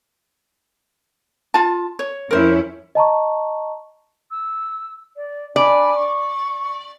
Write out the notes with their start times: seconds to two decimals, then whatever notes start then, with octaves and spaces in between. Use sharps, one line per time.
1.54 F4 A5
1.99 C#5
2.31 F2 C#4 E4 A#4 C5
2.95 D#5 A5 A#5 C#6
4.31 E6
5.16 D5
5.56 D4 D5 G#5 B5
5.95 C#6